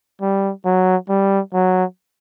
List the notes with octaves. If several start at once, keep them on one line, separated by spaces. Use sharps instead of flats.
G3
F#3
G3
F#3